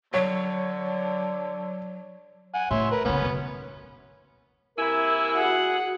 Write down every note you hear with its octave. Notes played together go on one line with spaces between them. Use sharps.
D3 F#3 C#5
F#5 G#5
A2 C#5 E5 C6
A#4 B4
A#2 C#3 B3 C#4
B1 F#2
C3 A#3 E4 A#4 G#5 E6
F#4 G#4 F#5